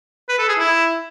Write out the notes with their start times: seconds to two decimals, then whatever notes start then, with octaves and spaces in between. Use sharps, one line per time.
0.29 B4
0.39 A4
0.48 G#4
0.58 E4